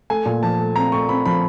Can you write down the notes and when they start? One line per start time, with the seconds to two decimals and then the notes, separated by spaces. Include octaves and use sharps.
0.10 A3 G#5
0.26 A#2
0.43 F3 A5
0.59 A3
0.76 C4 A#5
0.92 A3 C#6
1.09 C4 B5
1.25 F3 B5